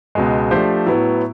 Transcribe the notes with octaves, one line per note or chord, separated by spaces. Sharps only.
C#2 B2 G#3
F3 A3 D4 G4 C5
A2 F#3 B3 E4